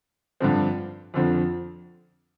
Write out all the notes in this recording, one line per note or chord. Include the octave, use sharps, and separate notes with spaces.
G2 D3 F3 C4
F2 D3 F3 C4